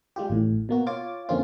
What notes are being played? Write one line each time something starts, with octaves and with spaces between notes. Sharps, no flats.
G3 G#3 F4 G4
A1 A2
B2 A#3 F#4
F4 C#5 D6 A6
F2 D3 A#3 C4 C#4 F4